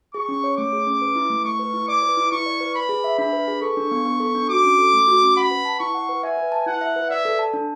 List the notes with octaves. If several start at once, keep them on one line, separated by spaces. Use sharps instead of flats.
G#4 C#6
C#4
C#5
A3 D6
G#4
C#4
B4
E4
A3
A3 C#6
B4
E4
D5 D6
B4
E4
E4 C#6
D5
B4
B4 B5
G#4
E5
D4 B5
B4
G#4
A4 C#6
D4
B3
B3
A4
D4
F#4 D6
C#4
A4
A3
F#4
C#4
F#5 B5
B4
A5
E4 C#6
F#5
B4
E5 G#5
B4
A5
E4 F#5
E5
B4
D5 E5
A4
A5
D4